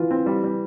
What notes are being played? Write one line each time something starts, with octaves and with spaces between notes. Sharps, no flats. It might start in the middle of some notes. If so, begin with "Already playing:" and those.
Already playing: E3 F4
C4
G3
G3